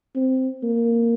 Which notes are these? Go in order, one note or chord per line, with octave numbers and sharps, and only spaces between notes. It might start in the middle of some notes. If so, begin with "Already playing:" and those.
C4
A#3